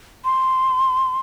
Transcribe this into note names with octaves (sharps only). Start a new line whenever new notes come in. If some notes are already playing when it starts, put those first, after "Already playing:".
C6